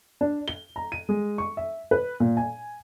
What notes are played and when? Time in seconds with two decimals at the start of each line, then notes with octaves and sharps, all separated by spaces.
0.21 D4
0.48 G7
0.76 A#5
0.92 D#7
1.09 G#3
1.38 C#6
1.57 E5
1.91 B4
2.20 A#2
2.37 G#5